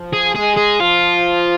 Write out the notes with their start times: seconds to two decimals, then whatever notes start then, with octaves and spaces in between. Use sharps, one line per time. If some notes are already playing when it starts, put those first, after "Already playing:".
Already playing: F3
0.14 G#4
0.35 G#3 G#4
0.57 G#4
0.80 F3 F4